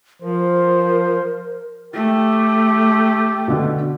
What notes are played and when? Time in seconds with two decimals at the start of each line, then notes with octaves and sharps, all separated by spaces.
0.22 F3 A#4 C5
1.94 A3 G4
3.48 B2 D3